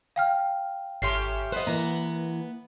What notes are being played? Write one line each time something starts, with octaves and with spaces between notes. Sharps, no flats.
F5 G5 F6
G#1 A3 C#4 G4 C6 C7
B3 B4 C5 D#5
E3 A#3 A#5